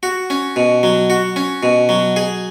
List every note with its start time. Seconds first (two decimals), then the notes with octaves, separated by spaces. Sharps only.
0.03 F#4
0.30 C#4
0.56 B2
0.83 F#3
1.10 F#4
1.36 C#4
1.63 B2
1.89 F#3
2.16 G#4